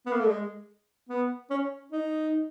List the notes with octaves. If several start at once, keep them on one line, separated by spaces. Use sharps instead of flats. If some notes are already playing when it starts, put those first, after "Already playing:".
B3
A#3
A3
G#3
B3
C#4
D#4